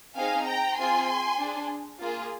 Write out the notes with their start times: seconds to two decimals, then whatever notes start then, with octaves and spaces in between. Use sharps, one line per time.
0.16 C4 D#4 G#4 F5 G#5
0.47 G5 A#5
0.78 C4 F4 G#4 G#5 C6
1.39 D4
1.44 G#4
2.01 A#3 F4 G#4